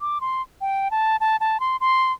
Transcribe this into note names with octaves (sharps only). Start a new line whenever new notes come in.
D6
C6
G5
A5
A5
A5
C6
C6